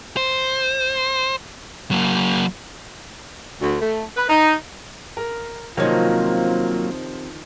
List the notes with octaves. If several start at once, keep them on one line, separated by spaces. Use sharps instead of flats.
C5
F#3 A#3
D2
A3
B4
D#4
A#4
C3 D#3 F3 F#3 A#3 C#4 D#4 F4